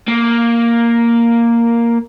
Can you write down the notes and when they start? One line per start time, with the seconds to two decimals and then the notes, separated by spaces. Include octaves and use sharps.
0.08 A#3